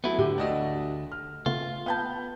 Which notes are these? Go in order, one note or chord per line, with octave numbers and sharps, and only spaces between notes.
F#3 A3 B3 E4
A2 D3 G4
D2 A3 D4 F#4 D#5
F6
C#3 A3 B3 F4
B3 F5 G5 A5 G6